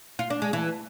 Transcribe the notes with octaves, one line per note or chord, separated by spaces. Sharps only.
F4
D4
G#3
E3